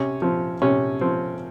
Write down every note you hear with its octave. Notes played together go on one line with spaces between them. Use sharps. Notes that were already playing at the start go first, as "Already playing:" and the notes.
Already playing: C3 C#4
F3 C4
C3 C#4
F3 C4